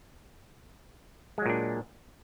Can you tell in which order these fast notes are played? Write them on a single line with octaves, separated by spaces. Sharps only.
G#3 F#3 A#2 D4